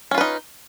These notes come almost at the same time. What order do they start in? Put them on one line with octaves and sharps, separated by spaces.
C#4 F4 B4 D#4